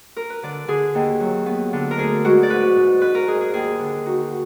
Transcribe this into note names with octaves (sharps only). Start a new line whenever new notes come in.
A#4
B4
D3 D5
D3 G#4
D#2
F#3
B3
D3
A#4
D2 G#4
G#3 F#4
D5
G#2 B4
G#2
G#2 B4
A#4
G#2 G#4
G#4
D#2 G#4
D3
D#4 F#4